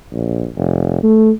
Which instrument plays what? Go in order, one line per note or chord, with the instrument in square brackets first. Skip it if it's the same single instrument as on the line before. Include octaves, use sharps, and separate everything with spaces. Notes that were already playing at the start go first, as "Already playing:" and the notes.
[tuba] A#1
F1
A3